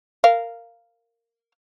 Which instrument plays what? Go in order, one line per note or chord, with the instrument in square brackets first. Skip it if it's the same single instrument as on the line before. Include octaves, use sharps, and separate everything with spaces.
[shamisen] A#4 F5